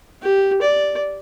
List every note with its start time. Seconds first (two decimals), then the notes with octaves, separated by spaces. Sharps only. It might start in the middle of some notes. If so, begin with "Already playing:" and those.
0.22 G4
0.62 D5